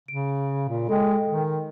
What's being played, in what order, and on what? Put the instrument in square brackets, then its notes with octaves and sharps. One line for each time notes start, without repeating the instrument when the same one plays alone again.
[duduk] C#3 [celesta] D7
[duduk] A#2
[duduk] G#3 [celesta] A4 G5
[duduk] D#3